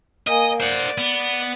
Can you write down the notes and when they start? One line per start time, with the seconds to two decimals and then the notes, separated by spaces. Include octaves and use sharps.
0.27 A#3 D#5 G#5
0.60 C5 D5 F#5
0.98 B3